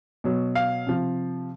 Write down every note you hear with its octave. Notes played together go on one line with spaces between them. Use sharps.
B2 F#3
F5
C3 F3